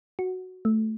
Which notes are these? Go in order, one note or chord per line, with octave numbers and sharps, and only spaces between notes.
F#4
A3